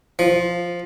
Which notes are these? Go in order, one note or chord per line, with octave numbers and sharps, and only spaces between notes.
F3